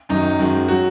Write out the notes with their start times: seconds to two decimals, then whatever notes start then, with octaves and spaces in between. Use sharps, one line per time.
0.09 F#2 D#3 F#3 D#4
0.39 F#2 D#3 G#3 F#4
0.68 F#3 F#4